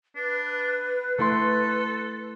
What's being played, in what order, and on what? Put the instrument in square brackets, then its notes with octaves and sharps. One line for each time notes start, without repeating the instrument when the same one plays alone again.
[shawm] D4 [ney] B4
[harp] A3 E4 C6 [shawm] A4 [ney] B4